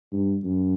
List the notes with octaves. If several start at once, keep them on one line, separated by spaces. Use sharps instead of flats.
G2
F#2